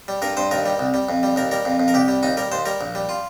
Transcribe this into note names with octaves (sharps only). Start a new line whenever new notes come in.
G3
G2 A#4
G2 C5
D#2 A#4
G3
C2
G3
F2
G3
D#2 A#4
G3 A#4
F2
F2
A#4
C2 G4
G3
D#2 D#4
G3 A#4
D#2 C5
G3 A#4
A#1
G3
F4